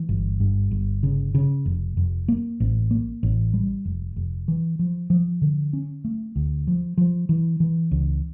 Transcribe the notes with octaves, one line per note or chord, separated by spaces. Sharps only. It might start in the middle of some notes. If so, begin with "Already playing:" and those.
Already playing: E3
G1
G2
G1
C#3
C#3
F1
F1
A#3
A1
A#3
A1
G3
F1
F1
E3
F3
F3
D3
C#4
A3
D2
F3
F3
E3
E3
C#2